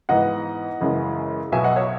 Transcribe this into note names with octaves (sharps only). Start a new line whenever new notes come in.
G#2 E3 B3 D#5 F#5
F#2 C#3 E3 G#3
B1 B2 F#3 B3 E5 G#5
D#5 F#5
C#5 E5